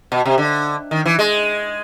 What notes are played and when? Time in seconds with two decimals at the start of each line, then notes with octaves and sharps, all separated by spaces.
0.12 B2
0.26 C3
0.38 D3
0.91 D#3
1.06 E3
1.19 G#3